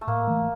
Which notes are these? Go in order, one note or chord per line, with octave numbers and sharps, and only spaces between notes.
A3
A2 A#3
E3 A3